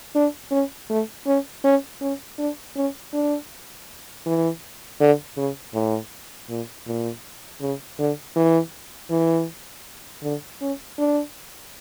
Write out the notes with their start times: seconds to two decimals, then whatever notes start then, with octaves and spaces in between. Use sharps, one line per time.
0.15 D4
0.51 C#4
0.90 A3
1.26 C#4
1.64 C#4
2.01 C#4
2.38 D4
2.76 C#4
3.13 D4
4.26 E3
5.00 D3
5.37 C#3
5.74 A2
6.49 A#2
6.86 A#2
7.61 C#3
7.99 D3
8.36 E3
9.10 E3
10.23 D3
10.61 C#4
10.98 D4